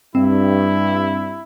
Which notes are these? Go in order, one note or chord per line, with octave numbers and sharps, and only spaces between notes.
G2 C4 E4